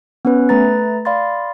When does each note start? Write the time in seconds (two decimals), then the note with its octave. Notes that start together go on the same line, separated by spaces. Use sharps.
0.25 B3 C#4 B4
0.49 A3 B4 A#5 A6
1.05 D5 F5 B5 C6 A6